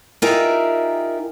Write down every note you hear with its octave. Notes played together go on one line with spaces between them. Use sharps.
D#4 F4 G4 G#4 A#4 E5